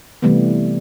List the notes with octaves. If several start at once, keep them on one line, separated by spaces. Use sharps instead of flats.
C3 E3 G3 A3 B3